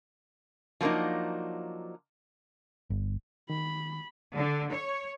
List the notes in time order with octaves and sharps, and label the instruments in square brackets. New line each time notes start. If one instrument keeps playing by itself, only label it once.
[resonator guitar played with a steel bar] F3 F#3 A#3 D4 D#4
[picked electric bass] G1
[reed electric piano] D#3 [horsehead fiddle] B5
[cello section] D3
C#5